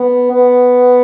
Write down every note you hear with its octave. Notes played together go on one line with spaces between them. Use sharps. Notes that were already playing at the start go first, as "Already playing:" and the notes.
Already playing: B3
B3